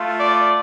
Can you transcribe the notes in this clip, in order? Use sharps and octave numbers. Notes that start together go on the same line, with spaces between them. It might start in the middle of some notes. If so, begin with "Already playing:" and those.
Already playing: A3 F4
D5